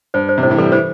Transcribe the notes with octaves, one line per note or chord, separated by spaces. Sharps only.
G2 C5
C5
C3
A2 C5
E3
G3 A4
E3 C5